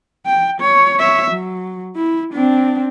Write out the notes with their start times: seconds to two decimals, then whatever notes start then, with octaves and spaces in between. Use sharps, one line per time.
0.26 G5
0.61 C#5
0.99 C#5 E5
1.31 F#3
1.96 E4
2.34 C4 D4